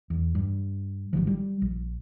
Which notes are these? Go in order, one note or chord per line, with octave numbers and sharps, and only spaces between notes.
E2
G2
G#1 E2 D#3 F3
G3
A#1